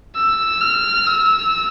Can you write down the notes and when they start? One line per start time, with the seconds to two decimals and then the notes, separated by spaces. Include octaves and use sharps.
0.15 E6
0.61 F6
1.06 E6